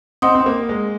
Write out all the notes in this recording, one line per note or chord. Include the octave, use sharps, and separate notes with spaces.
C4 D#5 F#5 C6 D#6
C4
A#3
G#3